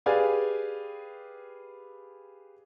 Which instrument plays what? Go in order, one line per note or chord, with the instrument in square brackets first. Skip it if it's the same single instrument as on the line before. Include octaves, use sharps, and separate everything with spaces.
[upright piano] G4 G#4 B4 D5 F5 G#5